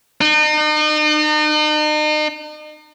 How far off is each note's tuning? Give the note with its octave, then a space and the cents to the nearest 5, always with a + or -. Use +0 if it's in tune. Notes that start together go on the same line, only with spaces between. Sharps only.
D#4 -40